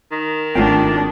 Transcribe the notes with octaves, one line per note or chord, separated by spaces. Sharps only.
D#3
G#1 G#3 A3 C4 D4 F4 G5